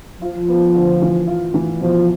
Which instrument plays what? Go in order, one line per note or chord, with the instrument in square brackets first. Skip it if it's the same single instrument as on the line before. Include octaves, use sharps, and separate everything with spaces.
[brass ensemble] F3 [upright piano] F4
[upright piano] B3
D3
E3
F4
E3
[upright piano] B2 [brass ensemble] F3